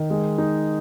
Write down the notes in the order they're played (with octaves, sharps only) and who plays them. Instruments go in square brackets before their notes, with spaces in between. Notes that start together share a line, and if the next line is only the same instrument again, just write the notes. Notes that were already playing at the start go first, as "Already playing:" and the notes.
Already playing: [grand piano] D#3
G#3
D#4